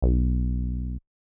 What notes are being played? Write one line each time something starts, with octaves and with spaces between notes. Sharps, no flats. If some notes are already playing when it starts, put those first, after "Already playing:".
B1